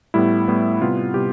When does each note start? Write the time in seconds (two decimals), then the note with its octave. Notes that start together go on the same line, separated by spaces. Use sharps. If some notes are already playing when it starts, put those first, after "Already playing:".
0.14 A2 G3 B3 E4
0.48 A2 G3 B3
0.81 C3 G3 B3 F4
1.14 C3 G3 B3 G4